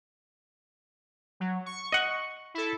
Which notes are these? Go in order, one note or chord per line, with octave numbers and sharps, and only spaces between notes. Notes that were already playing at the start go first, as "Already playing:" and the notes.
F#3
C#6
D#5 F#5
E4 A4